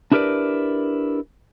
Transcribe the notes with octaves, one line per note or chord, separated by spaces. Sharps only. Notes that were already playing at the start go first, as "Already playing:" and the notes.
D4 E4 G4 A#4 B4 D5